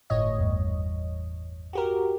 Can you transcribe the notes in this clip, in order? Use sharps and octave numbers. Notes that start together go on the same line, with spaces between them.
G1 A2 C#5 D#5
E2 G2
F#4 G4 A#4